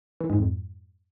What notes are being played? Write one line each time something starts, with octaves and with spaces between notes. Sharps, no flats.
E3
G#2
F2